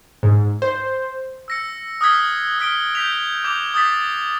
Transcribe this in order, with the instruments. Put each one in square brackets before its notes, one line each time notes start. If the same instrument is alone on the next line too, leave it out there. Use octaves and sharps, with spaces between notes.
[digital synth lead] G#2
C5
[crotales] E6 A#6 C#7
D#6 F6 F#6 G#6 B6 G7
D#6 F6 B6 D7 G7
G6 B6 F7
D6 G6 F7
D#6 G6 A6 B6